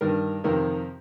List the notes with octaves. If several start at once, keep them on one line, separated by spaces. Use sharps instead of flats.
G2 D#3 A#4
F2 C3 D#3 A#4